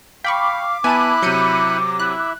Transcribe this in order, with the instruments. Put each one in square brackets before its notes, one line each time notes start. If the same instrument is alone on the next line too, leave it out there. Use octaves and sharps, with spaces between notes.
[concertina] F5 [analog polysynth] G5 B5 C#6 [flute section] D6 [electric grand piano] B6
[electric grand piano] B3 [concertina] E4 B5 F#6 [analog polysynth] G#5 A5 D#7
[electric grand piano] C3 F#3 [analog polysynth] G6 C#7 D#7
[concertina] E4 E5 [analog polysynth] F#6